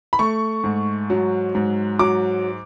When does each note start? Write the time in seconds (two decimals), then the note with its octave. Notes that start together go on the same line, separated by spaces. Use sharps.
0.13 B5
0.19 A3 C#6
0.64 G#2
1.10 F#3
1.55 G#2
1.99 F#3 D6